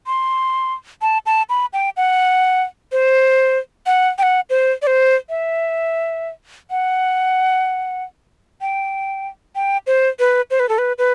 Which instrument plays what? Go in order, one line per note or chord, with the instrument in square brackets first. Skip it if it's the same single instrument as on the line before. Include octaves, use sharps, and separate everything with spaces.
[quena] C6
A5
A5
B5
G5
F#5
C5
F#5
G5
F#5
C5
D5
C5
E5
F#5
G5
G5
C5
B4
C5
B4
A4
B4
B4